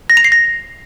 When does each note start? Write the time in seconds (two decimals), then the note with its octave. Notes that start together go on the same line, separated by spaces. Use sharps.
0.10 A#6
0.17 F7
0.24 C7
0.32 A#6